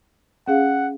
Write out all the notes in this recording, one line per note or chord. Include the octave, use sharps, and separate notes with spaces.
C#4 G#4 F5 F#5